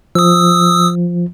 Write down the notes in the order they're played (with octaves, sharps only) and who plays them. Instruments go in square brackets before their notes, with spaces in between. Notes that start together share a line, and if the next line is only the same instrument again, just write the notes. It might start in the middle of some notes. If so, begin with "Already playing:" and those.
[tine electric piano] F3 [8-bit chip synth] D#6 E6